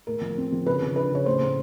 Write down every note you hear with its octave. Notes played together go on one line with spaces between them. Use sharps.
A2 A#4
F3
C4
F3
C#3 B4
F3
D4 B4
C#3 C#5
A2 C5
A2